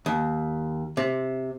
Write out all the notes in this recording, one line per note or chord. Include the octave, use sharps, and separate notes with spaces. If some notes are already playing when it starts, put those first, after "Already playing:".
D#2
C3